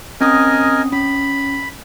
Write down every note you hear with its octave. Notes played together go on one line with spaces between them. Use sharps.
C4 C#4 A#4 D#5 G#5 D#6
C#4 B5